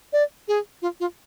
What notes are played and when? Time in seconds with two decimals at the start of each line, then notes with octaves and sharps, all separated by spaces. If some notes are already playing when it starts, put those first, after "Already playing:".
0.13 D5
0.48 G#4
0.82 F4
1.00 F4